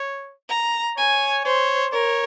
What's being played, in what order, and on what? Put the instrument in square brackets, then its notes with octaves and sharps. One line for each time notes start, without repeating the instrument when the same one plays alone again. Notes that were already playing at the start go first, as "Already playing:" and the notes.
Already playing: [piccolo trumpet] C#5
[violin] A#5
[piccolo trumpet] C#5 [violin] G#5
[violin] C5 [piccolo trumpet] C#5
[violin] A#4 [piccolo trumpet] C#5